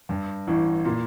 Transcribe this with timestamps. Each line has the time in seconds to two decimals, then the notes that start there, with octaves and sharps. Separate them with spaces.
0.09 G2
0.47 A1 A2
0.85 A#2